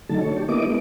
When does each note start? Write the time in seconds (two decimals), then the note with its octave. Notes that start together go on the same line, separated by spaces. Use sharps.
0.09 D3 F#3 A3 D#4 A5
0.21 C#5
0.37 D4 G4
0.49 A#3 B3 E4 D#5 D6
0.66 G#3